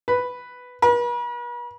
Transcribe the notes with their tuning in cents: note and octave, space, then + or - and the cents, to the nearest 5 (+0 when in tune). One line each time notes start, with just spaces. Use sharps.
B4 +5
B4 -45